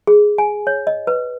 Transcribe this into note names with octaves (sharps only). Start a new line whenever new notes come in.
G#4
G#5
C#5
D#5
B4